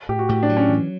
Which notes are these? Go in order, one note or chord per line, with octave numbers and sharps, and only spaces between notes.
A2 G4
F#4
A2 G4
D4
F#3
C#4
E3